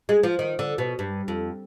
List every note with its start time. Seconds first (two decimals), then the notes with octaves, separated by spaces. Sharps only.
0.09 G#3
0.23 F3
0.39 D#3
0.59 D3
0.78 B2
0.99 G2
1.28 F2